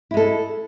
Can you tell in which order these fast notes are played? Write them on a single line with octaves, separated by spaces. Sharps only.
E4 G#3 A4